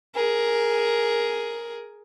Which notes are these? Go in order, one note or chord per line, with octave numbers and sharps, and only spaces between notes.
G#4 A#4